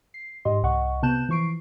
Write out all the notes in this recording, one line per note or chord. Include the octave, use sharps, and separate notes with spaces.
C7
G#2 G4 D#5 C6
C2 D#5 F#5 C#6
C3 B3 A5 F#6 G6 E7
E3 F3 C#6 C7 D7